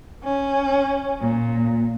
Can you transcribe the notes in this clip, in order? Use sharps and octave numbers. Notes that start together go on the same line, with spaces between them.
C#4
A#2